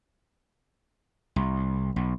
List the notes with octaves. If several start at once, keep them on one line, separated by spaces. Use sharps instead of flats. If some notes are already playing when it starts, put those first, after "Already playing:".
C2
B1